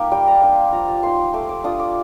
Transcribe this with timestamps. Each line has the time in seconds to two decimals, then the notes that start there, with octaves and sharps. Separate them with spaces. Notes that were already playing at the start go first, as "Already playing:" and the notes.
Already playing: A#3 D#4 G4 A#4
0.11 G3 G5
0.27 A5 A#5
0.42 A#3 D4
0.52 C6
0.73 F3 A#5
0.88 A5
1.03 A#3 D#4 C6
1.18 D6
1.34 A3 D6
1.49 D6
1.64 D4 F4 D#6
1.80 D6